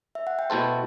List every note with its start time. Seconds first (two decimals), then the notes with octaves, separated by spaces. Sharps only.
0.15 E5
0.27 F#5
0.39 G5
0.50 B2 A3 E4 A4 C5 A5